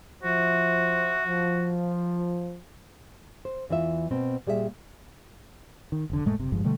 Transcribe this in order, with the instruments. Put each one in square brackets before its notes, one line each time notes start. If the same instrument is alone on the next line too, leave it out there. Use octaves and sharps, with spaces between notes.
[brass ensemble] F3 C5 E5 [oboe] F#4
[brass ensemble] F3
[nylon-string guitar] C5
E2 E3 F4 E5
B2 C4
A#2 G3 G#4 A4 E5
[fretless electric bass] D#3
F1 D3
F1 A2 G#3 A3
F#1 C3
G#1 G2 F3 G#3
B2 D3 G3 A3